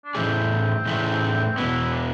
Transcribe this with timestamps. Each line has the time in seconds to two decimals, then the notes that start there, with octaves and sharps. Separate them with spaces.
0.05 D4
0.15 A2 E3 A3 C4 E4 G#4
0.86 A2 E3 A3 E4 G#4
1.56 E2 B2 B3 E4
1.92 D4